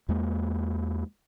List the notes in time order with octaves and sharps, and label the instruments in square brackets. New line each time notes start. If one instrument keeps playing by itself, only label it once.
[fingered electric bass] E2 G#3 A#3